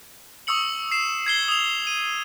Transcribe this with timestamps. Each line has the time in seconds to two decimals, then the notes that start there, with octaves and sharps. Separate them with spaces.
0.47 C#6 D#6 E6 C#7 F#7
0.92 C7 E7
1.26 G#6 C7 G7
1.48 D#6 F7
1.87 D#7